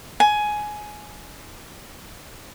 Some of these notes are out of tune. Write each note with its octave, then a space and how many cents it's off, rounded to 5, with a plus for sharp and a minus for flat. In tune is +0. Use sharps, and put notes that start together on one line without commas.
G#5 +15